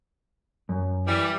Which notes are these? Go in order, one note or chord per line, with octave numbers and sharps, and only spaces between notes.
F#2
E3 G3